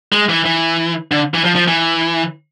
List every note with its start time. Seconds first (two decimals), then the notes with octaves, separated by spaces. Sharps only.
0.12 G#3
0.29 E3
0.45 E3
1.12 D3
1.34 E3
1.45 F3
1.56 F3
1.68 E3